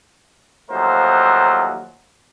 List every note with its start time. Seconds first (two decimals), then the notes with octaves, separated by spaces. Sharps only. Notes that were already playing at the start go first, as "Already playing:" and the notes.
0.70 D#2 F3 F#3 A3 A#4 C5